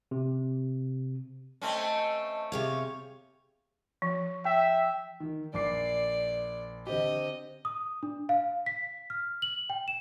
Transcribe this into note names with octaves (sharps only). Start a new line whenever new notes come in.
C3
A3 C4 C#4 D#5 A5
C3 G#4 C#5 F5
F3
E5 G5
D#3
A#1 D5 D6 C7
D3 C4 G4 D#5
D#6
D4
F5
B6
F6
F#7
G5
E7